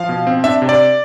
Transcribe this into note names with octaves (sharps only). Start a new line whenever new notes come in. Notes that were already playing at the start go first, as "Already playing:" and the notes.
Already playing: F3 F5
B2
C4
D4 E5
C3
D5